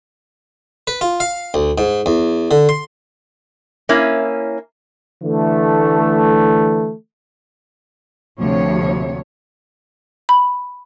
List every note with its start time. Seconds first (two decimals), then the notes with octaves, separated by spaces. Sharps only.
0.87 B4
1.01 F4
1.20 F5
1.54 D2
1.78 G#2
2.06 E2
2.51 D3
2.69 C6
3.89 A#3 C#4 E4
5.23 D3 E3 A3
8.39 D2 C3 F3 C#5
10.29 B5